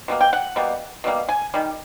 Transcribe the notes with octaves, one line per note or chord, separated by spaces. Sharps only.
B2 G3 A#3
G5
F#5
B2 G3 A#3
B2 G3 A#3
G#5
D#3 G3